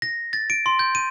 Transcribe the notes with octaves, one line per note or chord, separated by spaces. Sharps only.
A#6
A6
D7
C6
G6
D#7